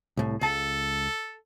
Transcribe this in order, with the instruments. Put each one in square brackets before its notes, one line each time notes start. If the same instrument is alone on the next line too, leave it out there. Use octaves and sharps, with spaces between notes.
[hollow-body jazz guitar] C2 A2
[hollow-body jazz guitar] C#2 A5 [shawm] A4